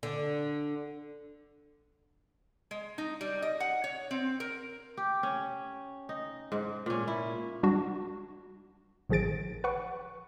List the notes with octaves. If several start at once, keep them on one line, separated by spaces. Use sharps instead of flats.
D3
G#3
D#4
G3
D#5
F#5
C#5
C4
A#4
G4
C#4
D#4
G#2
A#2 C#4
E4
G3 D4 F#4
A1 D#3 F3 G#4 A6 D7
B4 F#5 C#6